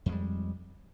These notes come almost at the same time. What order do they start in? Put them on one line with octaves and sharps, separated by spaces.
F2 G#3 G3